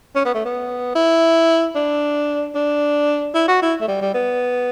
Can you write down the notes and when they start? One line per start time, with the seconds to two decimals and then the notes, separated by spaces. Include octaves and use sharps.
0.15 C#4
0.25 B3
0.34 A3
0.45 B3
0.95 E4
1.75 D4
2.55 D4
3.34 E4
3.48 F#4
3.62 E4
3.81 A3
3.88 G3
4.01 G3
4.14 B3